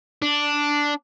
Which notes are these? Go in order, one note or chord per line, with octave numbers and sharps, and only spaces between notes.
D4